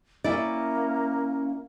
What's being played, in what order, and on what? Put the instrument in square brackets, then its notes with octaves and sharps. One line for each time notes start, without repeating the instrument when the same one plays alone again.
[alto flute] A#3 [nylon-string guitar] C#4 E4 D5